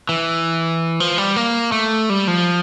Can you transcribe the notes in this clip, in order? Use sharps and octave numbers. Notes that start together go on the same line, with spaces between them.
E3
F3
G3
A#3
A3
G3
F3